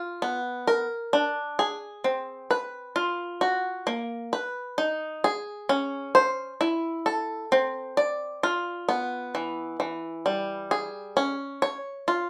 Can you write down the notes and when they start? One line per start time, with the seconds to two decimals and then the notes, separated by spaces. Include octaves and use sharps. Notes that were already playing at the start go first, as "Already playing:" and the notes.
Already playing: F4
0.22 B3
0.67 A#4
1.13 D4
1.59 G#4
2.04 C4
2.51 B4
2.96 F4
3.41 F#4
3.87 A#3
4.33 B4
4.78 D#4
5.24 G#4
5.69 C#4
6.15 C5
6.61 E4
7.06 A4
7.52 C4
7.97 D5
8.43 F4
8.89 B3
9.35 E3
9.80 E3
10.26 G3
10.71 G#4
11.17 C#4
11.62 C#5
12.08 F4